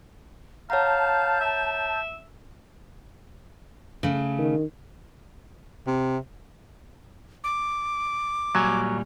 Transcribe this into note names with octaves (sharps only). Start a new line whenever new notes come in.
C#5 F5 F#5 A5 A#5 G6
E5
C#3 A3
D#3
C3
D6
A#2 F#3 G3 G#5